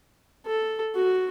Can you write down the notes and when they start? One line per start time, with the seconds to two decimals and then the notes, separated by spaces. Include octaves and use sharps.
0.47 A4
0.96 F#4